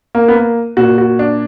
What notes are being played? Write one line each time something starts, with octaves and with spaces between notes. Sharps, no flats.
A#3
B3
A#3
A#2 F#4
F#4
D4